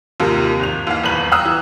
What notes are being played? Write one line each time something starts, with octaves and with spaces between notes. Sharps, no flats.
D#2 C3 D#3 F3
G#1 F7
D#2 E3 F5
D#1 E2 B4 F#7
F5 G5 A#5 D#6 E6 F#6
E3